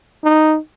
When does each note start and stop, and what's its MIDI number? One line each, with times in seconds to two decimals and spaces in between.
0.24 0.57 63